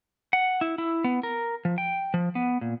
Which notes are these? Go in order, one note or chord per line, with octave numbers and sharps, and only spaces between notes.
F#5
E4
E4
B3
A#4
F3
G5
F3
B3
A#2